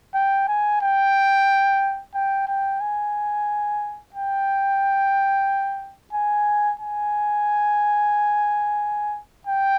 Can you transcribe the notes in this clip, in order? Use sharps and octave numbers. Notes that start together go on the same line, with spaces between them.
G5
G#5
G5
G5
G5
G#5
G5
G#5
G#5
G5